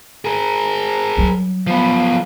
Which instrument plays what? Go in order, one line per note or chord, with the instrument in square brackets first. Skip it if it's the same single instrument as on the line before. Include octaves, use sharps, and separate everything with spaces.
[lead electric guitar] G#4 A#4
[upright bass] F#3 G3
[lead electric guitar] F3 B3